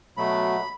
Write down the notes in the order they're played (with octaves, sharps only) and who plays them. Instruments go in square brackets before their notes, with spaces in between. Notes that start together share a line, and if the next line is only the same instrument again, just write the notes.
[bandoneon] B2 F#3 A3 B5